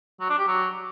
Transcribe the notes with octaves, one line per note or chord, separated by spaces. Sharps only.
F#3
D4
G4
F#3